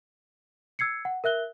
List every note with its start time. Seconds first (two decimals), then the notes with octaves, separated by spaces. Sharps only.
0.79 E6 G#6 C7 C#7
1.05 F#5
1.24 A#4 E5 F#6 G7